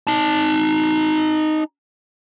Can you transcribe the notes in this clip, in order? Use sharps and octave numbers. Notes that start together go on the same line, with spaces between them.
D#4 A5